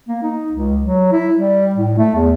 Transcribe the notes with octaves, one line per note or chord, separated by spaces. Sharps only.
A#3
D#4
C#2
F#3
E4
G3
A2
A3
E2